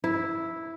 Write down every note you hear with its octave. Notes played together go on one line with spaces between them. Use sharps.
E4